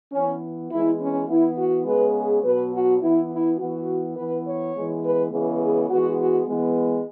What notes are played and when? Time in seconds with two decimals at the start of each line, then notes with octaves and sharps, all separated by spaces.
0.12 E3 B3 C#4
0.71 E3 G#3 B3 E4
0.99 C#4
1.28 E3 B3 E4
1.57 F#4
1.85 C#3 G#3 B3 B4
2.15 G#4
2.43 B2 F#3 B3 B4
2.73 F#4
3.01 E3 B3 E4
3.30 E4
3.58 E3 B3 F#4
4.16 E3 B3 B4
4.45 C#5
4.74 E3 G#3 B3
5.03 B4
5.31 C#3 E3 G#3 B3
5.60 G#4
5.89 E3 G#3 B3 F#4
6.18 F#4
6.46 E3 G#3 B3